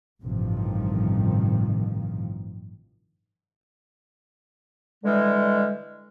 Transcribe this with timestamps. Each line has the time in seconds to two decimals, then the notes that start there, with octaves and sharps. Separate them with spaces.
0.22 A1 G2 C3 D#3 F3
5.04 D3 E3 G3 G#3